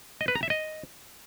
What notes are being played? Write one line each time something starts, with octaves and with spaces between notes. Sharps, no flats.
D#5
B4
A#5
E5
D#5